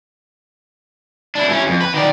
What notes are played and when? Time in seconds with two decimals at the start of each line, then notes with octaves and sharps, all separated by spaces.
1.35 D4 E4
1.49 E3 C#4
1.67 F2
1.81 B4
1.94 D#3 D5